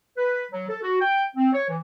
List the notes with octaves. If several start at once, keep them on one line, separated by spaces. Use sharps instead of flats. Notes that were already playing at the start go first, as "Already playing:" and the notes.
B4
F#3
A4
F#4
G5
C4
C#5
E3